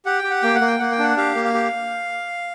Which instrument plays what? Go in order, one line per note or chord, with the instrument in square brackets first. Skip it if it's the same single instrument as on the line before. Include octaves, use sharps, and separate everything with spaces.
[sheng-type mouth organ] G4 F#5
G5
G4
F#5
A#3 G5
F#5
A#3
G5
A#3 F#5
G5
D4 F#5
G4 F5
A#3
F5
G4